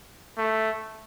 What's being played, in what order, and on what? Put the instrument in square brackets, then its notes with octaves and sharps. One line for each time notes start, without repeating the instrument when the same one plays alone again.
[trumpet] A3